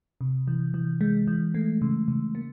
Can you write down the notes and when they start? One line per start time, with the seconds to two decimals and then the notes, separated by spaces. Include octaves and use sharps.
0.21 C3
0.48 E3
0.74 E3
1.01 G#3
1.27 E3
1.54 A3
1.82 C#3
2.08 C#3
2.35 A#3